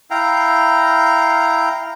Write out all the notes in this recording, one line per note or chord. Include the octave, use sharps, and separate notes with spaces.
E4 F5 G5 A#5